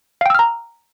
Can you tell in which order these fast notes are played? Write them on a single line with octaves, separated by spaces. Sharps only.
F5 G5 E6 F6 A#5